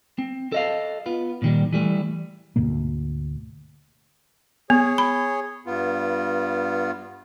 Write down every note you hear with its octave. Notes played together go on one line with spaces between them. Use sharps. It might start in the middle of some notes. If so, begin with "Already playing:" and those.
C4
A4 D#5 F5
B3 F4
A#2 D#3 G3
E3 G3 A3
D2 G#2 B2 A#3
B3 G#4 C#5
B5
G2 B3 F4